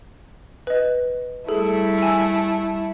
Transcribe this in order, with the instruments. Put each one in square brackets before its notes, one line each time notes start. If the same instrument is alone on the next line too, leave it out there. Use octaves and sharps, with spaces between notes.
[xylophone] B4 D#5
[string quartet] G3 A3 E4 [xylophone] G#4 A4
[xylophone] G#5 E6